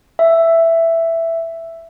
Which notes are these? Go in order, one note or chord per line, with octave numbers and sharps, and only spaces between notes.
E5